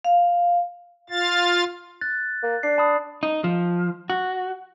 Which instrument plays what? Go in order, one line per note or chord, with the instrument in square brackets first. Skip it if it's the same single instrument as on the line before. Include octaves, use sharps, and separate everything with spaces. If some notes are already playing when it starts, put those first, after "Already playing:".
[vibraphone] F5
[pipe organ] F4 F5 A6
[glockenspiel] F#6 A6
[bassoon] A#3
[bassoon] D4 [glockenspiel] C7
[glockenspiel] A5 B5 D#6
[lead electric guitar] D#4
F3
F#4